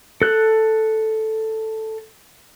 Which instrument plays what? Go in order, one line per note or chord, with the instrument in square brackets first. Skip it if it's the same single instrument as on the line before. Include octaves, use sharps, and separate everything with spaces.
[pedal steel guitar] A4 F#6